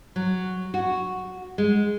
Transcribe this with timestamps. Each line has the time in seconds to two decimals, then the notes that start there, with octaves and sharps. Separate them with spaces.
0.16 F#3
0.74 F#4
1.58 G#3